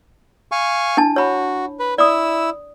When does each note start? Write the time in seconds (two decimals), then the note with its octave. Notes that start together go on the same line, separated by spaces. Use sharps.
0.52 F5 G#5 C#6
0.97 D4 E4 A5
1.16 F#4 C#5 B5
1.79 B4
1.98 E4 D5 D#6 E6